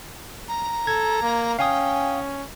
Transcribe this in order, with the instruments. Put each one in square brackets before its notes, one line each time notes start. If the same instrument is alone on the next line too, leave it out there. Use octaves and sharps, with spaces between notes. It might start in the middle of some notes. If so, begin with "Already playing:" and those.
[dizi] A#5
[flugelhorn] A4 [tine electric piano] G#6
[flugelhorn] A#3
[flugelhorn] C#4 [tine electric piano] F5 G#5 D#6 [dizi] G5